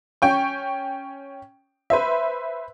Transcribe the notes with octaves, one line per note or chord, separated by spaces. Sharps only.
C#4 G5 C#6
B4 C5 E5